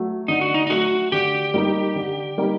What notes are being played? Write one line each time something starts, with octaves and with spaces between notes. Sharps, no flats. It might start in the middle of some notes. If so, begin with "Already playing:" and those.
Already playing: F#3 A3
D3 D#4
F#4
D#4
D#4
F#3 A3 F#4
D3 G4
G3 A#3 D#4
D3
G3 A#3 D#4